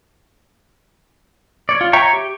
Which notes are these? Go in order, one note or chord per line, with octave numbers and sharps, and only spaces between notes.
C#5 D5
F4
C#5 E5 G5 A#5 C#6
G4